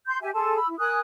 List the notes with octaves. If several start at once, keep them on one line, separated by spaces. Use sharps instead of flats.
C6 G6
G4 E5 G#5
G#4 A4 A5 C6
B5 E6
E4
A#4 G#5 D#6 F#6